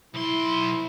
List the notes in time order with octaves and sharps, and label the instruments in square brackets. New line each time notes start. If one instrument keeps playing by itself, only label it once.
[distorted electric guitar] B1 C6 [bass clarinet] E4